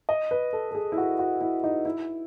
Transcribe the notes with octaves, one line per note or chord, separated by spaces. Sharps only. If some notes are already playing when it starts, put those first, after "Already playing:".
D#5
B4
A4
A4
G#4
E4
F#4
F#4
E4
D#4
E4